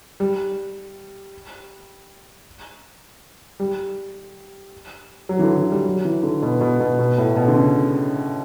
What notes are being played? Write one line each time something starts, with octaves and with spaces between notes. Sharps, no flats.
G3
G3
F#3
E3
D3
E3
G3
F#3
E3
D3
B2
B2
B2
B2
A2
B2
D3
C#3